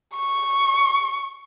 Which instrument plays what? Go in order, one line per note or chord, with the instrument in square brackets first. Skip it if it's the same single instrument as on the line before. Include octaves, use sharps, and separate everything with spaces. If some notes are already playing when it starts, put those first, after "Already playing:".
[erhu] C#6